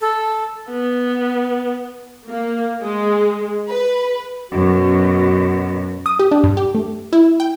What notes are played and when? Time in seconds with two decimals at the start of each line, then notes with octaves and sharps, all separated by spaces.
0.01 A4
0.71 B3
2.29 A#3
2.83 G#3
3.69 B4
4.51 F#2 B2 F#4
6.06 D#6
6.19 G4
6.31 D4
6.44 G2
6.57 G4
6.75 A3
7.13 E4
7.40 G5